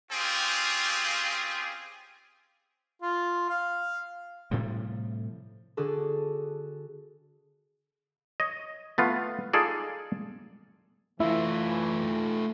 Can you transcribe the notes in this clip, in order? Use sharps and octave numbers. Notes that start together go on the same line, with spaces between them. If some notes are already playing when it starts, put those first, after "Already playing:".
C4 C#4 F4 G4 G#4
F4
F5
A2 C3 F3 G3
D3 D4 F#4 G#4 A4
C#5 D#5
A3 B3 F4
D#4 F4 G#4 A4 D5
E3 A3 E4 F4